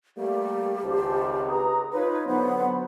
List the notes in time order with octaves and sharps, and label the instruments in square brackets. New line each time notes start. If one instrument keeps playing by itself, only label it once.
[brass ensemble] G3 A3 A#3 [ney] G4
[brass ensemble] G#1 C#2 [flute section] C5 A5
[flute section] B4 A#5 D#6
[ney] D#4 [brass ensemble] F4 B4 [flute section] C#5
[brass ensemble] D3 F#3 [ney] B3 [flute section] C5 F#5 B5